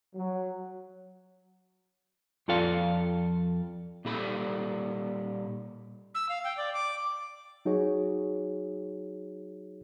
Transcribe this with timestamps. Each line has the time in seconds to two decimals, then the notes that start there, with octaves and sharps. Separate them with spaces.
0.15 F#3
2.48 F2 F3 F4 A4 D5 F5
4.05 A#2 G3 A4 B5
6.15 E6
6.29 F5
6.44 G5
6.57 D5
6.74 D6
7.65 F#3 D#4 F#4 G#4 C#5